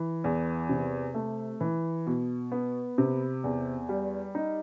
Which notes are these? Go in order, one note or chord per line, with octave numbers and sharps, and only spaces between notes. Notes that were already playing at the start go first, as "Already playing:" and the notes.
Already playing: E3
E2
C3
A3
E3
B2
B3
C3
E2
G3
D#4